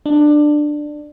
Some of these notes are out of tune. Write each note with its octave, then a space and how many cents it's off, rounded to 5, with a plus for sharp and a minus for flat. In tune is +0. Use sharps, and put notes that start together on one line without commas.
D4 +15